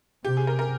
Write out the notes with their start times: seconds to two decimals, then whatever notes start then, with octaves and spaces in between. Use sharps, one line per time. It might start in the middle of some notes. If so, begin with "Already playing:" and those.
0.25 C3 G4
0.37 G#4
0.47 A#4
0.59 A#4